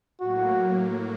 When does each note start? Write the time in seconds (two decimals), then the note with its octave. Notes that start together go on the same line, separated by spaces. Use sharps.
0.21 A2 F#3 A#3 F#4